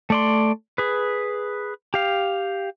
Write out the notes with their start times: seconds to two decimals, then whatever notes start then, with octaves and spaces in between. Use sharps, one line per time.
0.10 A3 D5 C6
0.78 G#4 B4
1.94 G4 F5